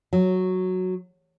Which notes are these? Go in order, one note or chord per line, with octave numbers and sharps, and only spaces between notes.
F#3